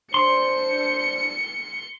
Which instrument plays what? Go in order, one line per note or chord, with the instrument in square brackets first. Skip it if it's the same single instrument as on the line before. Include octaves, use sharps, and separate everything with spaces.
[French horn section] D4 C5 [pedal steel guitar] C6 [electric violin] C#7